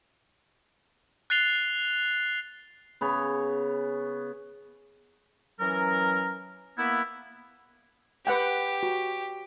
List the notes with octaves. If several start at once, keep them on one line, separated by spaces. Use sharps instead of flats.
F#6 A6 C7 F7 G7
C#3 B3 C#5
E3 F#3 C#4 A#4
A#3 B3 E4
G4 B4 F#5 G5
F#4